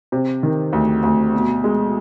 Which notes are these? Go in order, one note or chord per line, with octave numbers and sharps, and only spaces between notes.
C3
D#3
D2
D2
B2
G#3